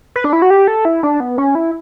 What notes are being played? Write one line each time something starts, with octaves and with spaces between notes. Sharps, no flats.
B4
D4
E4
F#4
G4
A4
E4
D4
B3
C#4
E4